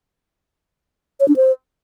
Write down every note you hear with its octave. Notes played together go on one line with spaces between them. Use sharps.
C#5
D4
C5